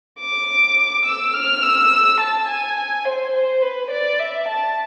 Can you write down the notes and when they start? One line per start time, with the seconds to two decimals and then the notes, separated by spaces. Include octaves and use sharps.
0.20 D6
1.05 E6
1.34 F6
1.63 E6
2.20 A5
2.48 G#5
2.77 G#5
3.05 C5
3.33 C5
3.62 B4
3.91 D5
4.19 E5
4.48 A5